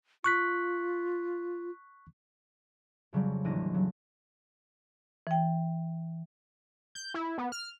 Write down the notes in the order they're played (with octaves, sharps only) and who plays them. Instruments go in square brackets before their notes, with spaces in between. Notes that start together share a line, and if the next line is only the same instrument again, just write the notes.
[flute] F4 [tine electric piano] C#6 F#6 B6
[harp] F2 C#3 F#3 G3
A1 D#2 D4 A#6 D#7
C#3 F#3
[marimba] E3 G5
[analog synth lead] G6
E4
B3
F6